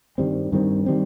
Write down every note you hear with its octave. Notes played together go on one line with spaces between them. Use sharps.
G2 D#3 G3 C4
G2 D#3 G3 C4
D#3 G3 C4